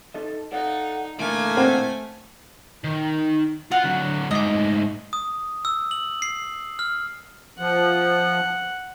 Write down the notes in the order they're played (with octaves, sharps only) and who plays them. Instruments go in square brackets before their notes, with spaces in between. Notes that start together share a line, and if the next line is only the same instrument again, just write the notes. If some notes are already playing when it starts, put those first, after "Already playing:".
[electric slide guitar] D#4 A4 D#5
[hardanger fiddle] D#4 [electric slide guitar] A4 D5 F5 [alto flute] F#5
[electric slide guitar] A#2 D3 E3 [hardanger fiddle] A3 G#5 [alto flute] A#3
[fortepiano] C4 C5 F#5
[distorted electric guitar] D#3
[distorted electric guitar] F4 F5 [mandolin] F#5
[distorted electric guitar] D2 F#3
[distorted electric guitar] G#2 A3 [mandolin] D#5 D6
[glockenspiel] D#6
E6
F#7
C7
F6
[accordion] F3 [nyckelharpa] F#5